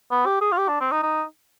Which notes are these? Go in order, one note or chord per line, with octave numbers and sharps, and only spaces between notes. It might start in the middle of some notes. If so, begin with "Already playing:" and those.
B3
G4
G#4
F4
G4
D4
C4
D#4
D#4